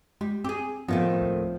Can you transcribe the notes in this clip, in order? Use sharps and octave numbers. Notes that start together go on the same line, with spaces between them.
G3 G#3
C4 G4 G#4
A2 D#3 F3 A3 B3 C4
C#2